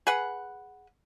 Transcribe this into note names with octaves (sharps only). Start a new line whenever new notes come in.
G#4 B4 F#5